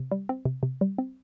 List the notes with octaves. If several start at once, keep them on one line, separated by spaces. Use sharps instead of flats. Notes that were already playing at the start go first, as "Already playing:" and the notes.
Already playing: C3
G3
C4
C3
C3
G3
C4